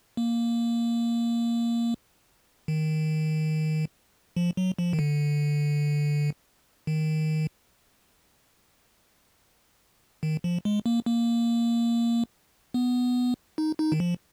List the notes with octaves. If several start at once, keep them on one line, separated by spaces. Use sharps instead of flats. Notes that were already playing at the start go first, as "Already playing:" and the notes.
A#3
D#3
F3
F#3
F3
D#3
D3
D#3
D#3
F3
G#3
A#3
A#3
B3
D#4
D#4
D#3
F3